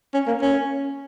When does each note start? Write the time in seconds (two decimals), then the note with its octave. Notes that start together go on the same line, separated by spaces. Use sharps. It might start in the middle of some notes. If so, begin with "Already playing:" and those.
0.14 C#4
0.28 A#3
0.42 C#4